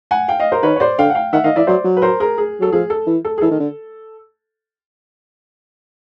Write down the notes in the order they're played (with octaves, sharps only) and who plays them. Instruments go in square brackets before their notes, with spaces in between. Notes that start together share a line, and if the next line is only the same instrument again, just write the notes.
[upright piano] F#5 G#5
F5 G5
D#5 F5
A#4 C5
[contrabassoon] D#3 [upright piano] B4 C#5
[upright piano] C#5
C5 D5
[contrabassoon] D3 [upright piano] F5 G5
[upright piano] F#5
F5 G5
[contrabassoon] D#3 [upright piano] E5 F#5
[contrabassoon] D#3 [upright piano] D#5 F5
[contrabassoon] E3 [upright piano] D5 E5
[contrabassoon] F#3 [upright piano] C5 D5
[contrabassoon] F#3
[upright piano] B4
A#4 C5
G#4 A#4
G#4
[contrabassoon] F#3 [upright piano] A4
[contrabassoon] F3 [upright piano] G#4
[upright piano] A4
[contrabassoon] E3
[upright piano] A4
G#4
[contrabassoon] E3 [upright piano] A4
[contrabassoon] D#3
D3